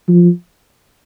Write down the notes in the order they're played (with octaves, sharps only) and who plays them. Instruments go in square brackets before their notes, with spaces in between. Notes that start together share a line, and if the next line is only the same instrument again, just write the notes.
[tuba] F3